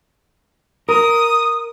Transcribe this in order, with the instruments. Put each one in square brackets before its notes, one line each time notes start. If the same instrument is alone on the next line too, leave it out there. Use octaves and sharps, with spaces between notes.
[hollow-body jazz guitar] A#4 [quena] D#6